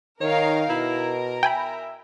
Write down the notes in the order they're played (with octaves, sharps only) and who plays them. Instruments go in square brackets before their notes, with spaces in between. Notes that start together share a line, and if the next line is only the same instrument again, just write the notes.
[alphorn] D#3 [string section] D#4 A#4 F5 [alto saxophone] C#5
[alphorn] B2 [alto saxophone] E4 [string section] A#4
[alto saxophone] E5 [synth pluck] G5 G#5 B5